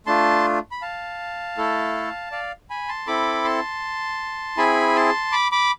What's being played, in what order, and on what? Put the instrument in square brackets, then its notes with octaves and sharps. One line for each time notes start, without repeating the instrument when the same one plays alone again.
[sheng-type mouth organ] A3 D4 F4 A5 C6
B5
F5 A5
A3 E4 A4
D5 F5
G#5 B5
A5 C6
C4 E4 A4 B5 D6
A5 C6
C4 E4 G#4 G#5 B5
A5 C6
B5 D6
B5 D6